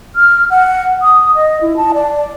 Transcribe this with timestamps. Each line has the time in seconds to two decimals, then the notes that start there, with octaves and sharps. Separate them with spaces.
0.16 F6
0.50 F#5
1.02 D#6
1.35 D#5
1.62 E4
1.77 A5
1.94 D5